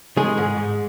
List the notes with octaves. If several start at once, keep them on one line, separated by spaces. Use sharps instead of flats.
D#3 G#3 G#4
G#2
G#2